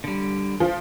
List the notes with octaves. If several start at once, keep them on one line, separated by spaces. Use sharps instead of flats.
D3 G3
F3